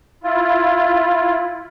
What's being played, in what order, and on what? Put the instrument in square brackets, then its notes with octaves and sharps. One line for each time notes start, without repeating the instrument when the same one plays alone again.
[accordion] E4 F4